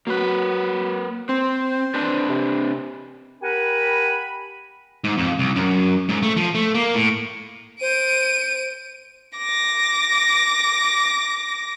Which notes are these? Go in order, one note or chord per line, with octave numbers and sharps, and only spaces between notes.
F#3 A#3 B4
C4 C5
C4 D4 B4
C3
G4 A#4 F#5 G#5 B5
G#2
F2
C2
F#2
G#2
A3
F3
A3
A#3
A2
C5 D7 D#7
D6 A#6